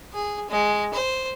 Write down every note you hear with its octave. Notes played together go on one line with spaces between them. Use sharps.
G#4
G#3
C5